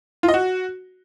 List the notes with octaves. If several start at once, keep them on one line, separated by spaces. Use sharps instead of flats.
F4
D#5
F#4